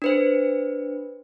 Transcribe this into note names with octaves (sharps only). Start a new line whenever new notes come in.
D4 B4 C5